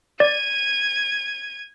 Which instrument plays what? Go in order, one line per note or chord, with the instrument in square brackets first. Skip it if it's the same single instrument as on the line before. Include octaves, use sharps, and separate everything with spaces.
[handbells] D5 [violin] G#6 D#7